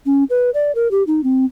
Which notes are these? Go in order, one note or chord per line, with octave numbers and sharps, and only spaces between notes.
C#4
B4
D5
A#4
G4
D#4
C4